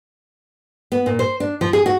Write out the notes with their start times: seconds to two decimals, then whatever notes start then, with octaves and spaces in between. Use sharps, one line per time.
0.92 B3
1.06 A#2
1.19 C5
1.40 D4
1.61 F3
1.73 G#4
1.86 F#4